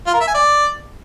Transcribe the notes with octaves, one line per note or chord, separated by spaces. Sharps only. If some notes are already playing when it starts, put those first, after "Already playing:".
F4
A#4
E5
G#5
D5